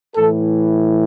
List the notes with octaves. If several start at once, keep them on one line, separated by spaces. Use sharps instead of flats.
A2 E3 A4